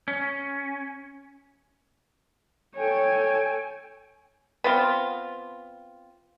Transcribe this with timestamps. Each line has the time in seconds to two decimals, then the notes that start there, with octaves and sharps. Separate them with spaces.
0.08 C#4
2.76 A4 C#5 G5 G#5
4.64 B3 C4 F4